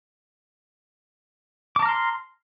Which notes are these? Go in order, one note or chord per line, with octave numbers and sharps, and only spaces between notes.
A5 A#5 C6 D6 F6